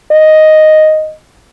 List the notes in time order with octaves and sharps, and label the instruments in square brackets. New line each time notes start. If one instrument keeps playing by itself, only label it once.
[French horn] D#5